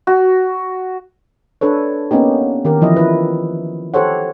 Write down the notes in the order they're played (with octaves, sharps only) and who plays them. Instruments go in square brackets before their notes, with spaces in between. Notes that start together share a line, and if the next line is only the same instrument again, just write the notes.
[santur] F#4
[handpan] D4 A4 B4 C#5
A#3 B3 C#4 D#4 G4
D#3 G4 A#4
E3 F3 E4 D#5
E4 B4
G4 A4 C5 C#5 F#5